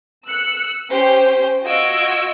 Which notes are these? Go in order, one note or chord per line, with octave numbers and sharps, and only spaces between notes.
E6 F#6 C#7
C#4 G4 C5
F4 F#4 D#5 E6 G#6 D7